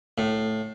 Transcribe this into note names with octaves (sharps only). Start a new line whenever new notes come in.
A2